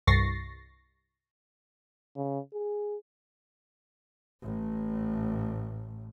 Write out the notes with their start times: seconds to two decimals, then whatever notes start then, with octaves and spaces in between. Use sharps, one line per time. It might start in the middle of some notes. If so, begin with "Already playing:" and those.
0.07 C2 G2 C#6 A6 A#6 C7
2.17 C#3
2.54 G#4
4.42 A1 A2